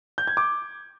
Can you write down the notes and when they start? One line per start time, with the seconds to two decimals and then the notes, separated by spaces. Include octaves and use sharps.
0.18 G6
0.27 G#6
0.37 D6